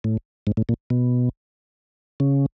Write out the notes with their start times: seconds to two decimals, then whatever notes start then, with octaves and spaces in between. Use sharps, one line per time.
0.04 A2
0.47 G#2
0.57 A2
0.69 A#2
0.90 B2
2.20 C#3